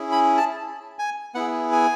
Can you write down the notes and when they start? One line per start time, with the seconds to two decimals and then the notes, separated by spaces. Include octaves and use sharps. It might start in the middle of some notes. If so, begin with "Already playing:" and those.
Already playing: C#4 E4 G#4
0.12 B5
0.37 A5
0.99 G#5
1.35 B3 E4 G#4 F#5
1.72 G#5